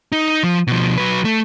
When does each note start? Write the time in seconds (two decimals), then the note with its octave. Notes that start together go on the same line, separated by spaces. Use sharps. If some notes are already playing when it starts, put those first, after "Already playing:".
0.12 D#4
0.44 F3
0.67 B2 F3
0.98 F#3 B4
1.25 A3